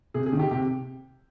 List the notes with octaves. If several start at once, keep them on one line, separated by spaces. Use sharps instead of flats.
C3 G#4
G#4
D#3
G4
C3 G4